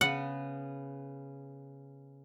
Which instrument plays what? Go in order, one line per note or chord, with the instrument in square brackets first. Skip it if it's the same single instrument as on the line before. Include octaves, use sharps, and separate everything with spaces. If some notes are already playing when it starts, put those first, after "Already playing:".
[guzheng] C#3 B3 [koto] F#5